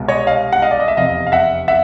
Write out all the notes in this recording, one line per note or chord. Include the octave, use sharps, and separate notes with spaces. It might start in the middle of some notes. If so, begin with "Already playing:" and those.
Already playing: C2 B2 G#3
C#5 D#5
D#5 F5
F#5
D#5 F5
D5
D#5
E5
F1 E2 C3 D#5 F5
F5
E5 F#5
E5 F#5